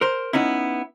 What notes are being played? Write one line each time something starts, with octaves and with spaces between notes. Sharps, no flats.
A#4 C5
B3 C#4 D#4 E4